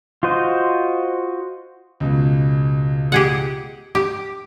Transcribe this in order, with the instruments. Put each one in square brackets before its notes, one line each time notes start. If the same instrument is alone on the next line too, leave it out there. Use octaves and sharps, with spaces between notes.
[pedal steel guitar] F4 F#4 C5 D#5
[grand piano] C#2 B2
[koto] G4 G#4 F#5
[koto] G4 [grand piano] D6